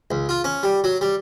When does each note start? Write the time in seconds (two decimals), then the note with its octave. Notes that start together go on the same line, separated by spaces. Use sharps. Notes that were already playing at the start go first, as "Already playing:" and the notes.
0.11 C#2
0.29 F4
0.44 C#4
0.63 G3
0.84 F#3
1.01 G3